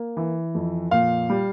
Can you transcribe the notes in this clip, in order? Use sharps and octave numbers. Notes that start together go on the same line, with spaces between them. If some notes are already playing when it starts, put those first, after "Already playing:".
Already playing: A#3
E3
F2
A#2 F5
G3